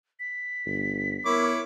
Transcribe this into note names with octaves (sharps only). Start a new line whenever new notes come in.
B6
G1
B3 E4 A#4 C#5 D6